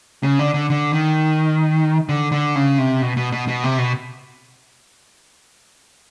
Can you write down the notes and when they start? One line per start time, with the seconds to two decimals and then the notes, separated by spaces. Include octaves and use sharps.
0.23 C#3
0.39 D3
0.54 D3
0.70 D3
0.93 D#3
2.09 D3
2.32 D3
2.55 C#3
2.78 C3
3.02 B2
3.17 B2
3.32 B2
3.48 B2
3.64 C3
3.78 B2